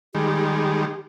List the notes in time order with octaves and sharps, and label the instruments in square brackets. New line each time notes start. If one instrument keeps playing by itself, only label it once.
[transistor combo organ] D#3 G3 G#3 [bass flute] G4